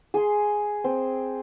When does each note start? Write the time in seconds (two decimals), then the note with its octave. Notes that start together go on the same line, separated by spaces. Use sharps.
0.14 G#4 C6
0.84 C4